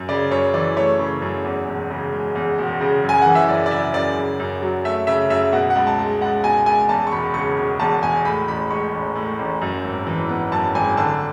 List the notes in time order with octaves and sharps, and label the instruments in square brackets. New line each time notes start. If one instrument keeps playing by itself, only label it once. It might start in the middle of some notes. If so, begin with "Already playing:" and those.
Already playing: [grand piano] F#2
C#3 D5
F#2 C#5
E3 D5
A3 C#5
C#3
F#2
E2
E1
C#3
G#3
E2
E1
C#3
F#2
G#5
E3 F#5
E5
F#2 D5
D5
C#3 E5
F#2 D5
C#3
F#2
F#3
A3 E5
C#3 E5
F#2 E5
B2 F#5
F#5
C#2
A5
G#3
C#2 F#5
B2 G#5
C#2 G#5
E2 A5
C#6
E1 B5
C#3 C#6
E1
E2 A5
E1 G#5
A2 B5
A1 B5
G#3 C#6
A1
A2
A1
F#2
G#1
E3
B3
F#2 A5
G#1 G#5
D3 A5